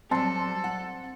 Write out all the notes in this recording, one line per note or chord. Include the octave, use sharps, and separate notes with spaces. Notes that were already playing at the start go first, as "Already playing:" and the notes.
F#3 G3 C4 A4 A5 C6
F#5